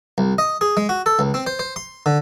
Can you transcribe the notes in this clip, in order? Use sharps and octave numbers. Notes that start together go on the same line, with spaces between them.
C2
D#5
G#4
G#3
F#4
A4
C#2
C4
C5
C5
C6
D3